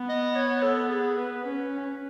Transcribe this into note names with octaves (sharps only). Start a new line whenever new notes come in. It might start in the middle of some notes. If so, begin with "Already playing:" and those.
Already playing: B3
D#5
C#5
A4
G#4
B4
C#4 B4